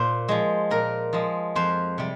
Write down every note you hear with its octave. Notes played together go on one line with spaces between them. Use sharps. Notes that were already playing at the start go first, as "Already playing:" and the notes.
Already playing: A#2 C5
F3 G#3
A#2 A#4
F3 G#3
F2 C5
C3 G3